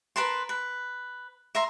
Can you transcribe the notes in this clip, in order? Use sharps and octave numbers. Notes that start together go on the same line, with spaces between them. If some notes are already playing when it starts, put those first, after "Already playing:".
A#4 B4 A5 C6
B4
E5 A#5 C6